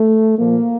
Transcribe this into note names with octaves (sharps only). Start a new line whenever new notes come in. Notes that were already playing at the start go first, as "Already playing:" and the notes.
Already playing: A3
A#2 F3 A#3